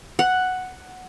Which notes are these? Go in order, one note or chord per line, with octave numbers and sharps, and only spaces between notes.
F#5